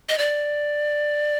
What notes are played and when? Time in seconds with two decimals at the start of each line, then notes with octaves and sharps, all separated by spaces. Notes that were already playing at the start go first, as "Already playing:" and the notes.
0.09 D#5
0.18 D5